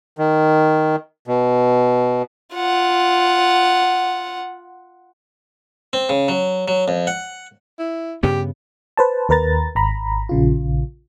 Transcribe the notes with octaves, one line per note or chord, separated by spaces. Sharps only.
D#3
B2
F4 F#5
C4
C#3
F#3
F#3
F2
F#5
E4
G2 C#3 B3 G4
B4 C5 A5
D#2 A#4 B4 A#5 A6
G#1 A#5 B5
A#1 C#3 F4